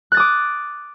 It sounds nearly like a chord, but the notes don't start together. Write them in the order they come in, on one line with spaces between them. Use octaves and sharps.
F#6 A6 D#6 D6